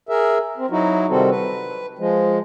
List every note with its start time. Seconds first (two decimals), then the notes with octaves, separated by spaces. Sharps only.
0.09 G#4 A#4 E5
0.57 C4
0.70 F#3 D#4 E4 F#4
1.09 C3 D#3 G3 C4 F#4 A4
1.31 B4
1.99 F3 G#3